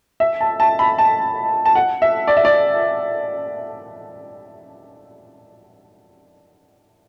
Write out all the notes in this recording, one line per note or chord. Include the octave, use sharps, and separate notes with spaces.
E5
A5
A5
B5
A5
A5
F#5
E5
D5
E5
D5